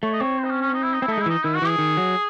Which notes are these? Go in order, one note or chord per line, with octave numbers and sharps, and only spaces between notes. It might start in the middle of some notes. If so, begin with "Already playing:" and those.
A3 C#5
D#5
C4 C#5
C5
D#4
C#4
C#4
D#4
E4
D#4
C4 E4
A3 D#4
G#3 E4
E3 D#4
D#3 E4
F#4
E3
G#4
D#3
F#3